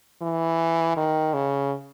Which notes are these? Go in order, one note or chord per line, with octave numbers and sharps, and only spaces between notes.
E3
D#3
C#3